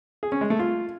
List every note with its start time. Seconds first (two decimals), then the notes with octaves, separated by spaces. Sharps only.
0.23 G#4
0.32 C#4
0.41 G#3
0.50 A3
0.59 F4